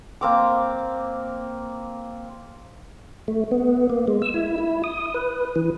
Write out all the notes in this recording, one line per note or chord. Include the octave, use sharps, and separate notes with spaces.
A#3 C4 D6
A3
B3
A#3
G#3
E6
E4
E4
D#6
B4
E3